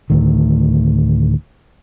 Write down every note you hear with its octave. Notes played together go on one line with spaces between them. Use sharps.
D2 A2 D#3